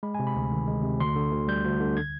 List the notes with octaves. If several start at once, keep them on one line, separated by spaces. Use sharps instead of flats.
G#3 B5
C3 G#5
B5
D2
D#3
G#3
C3
D2 C6
D3
D2
G3 G6
D2
D3
G#6